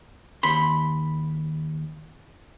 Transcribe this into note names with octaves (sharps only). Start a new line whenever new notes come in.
D#2 B5 C6